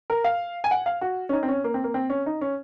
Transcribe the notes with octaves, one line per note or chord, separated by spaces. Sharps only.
A#4
F5
G#5
F#5
F5
F#4
C#4
D#4
C4
C#4
A#3
C4
A#3
C4
C#4
D#4
C#4